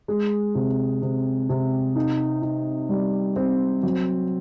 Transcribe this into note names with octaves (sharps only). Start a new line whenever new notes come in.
G#3
C3
C3
C3
D#4
D#4
G3
C4
F#3